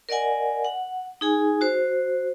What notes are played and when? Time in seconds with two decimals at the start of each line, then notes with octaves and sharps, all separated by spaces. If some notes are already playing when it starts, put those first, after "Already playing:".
0.09 A#4 D5 D#5 F#5 G#5
0.65 F#5
1.21 D#4 G#4 G#5
1.61 F#4 C5